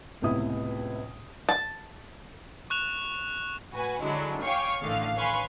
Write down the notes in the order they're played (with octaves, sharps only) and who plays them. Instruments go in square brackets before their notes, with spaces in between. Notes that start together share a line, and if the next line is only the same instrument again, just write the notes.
[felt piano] C#2 A2 C3 B3 E4 D#6
[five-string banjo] A5
[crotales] C#6 F#6 E7 F7
[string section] A2 F#4 B4 G#5
D3 F#3 G#3 D4 E4
C#5 F5 G5 G#5 C#6 D6
A1 D3 D#3 A3 F5 F6
B4 C#5 F5 G#5 B5 C6